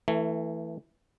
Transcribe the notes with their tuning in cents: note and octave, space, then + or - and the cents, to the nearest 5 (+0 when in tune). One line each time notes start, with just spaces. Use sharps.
E3 +0 A3 +20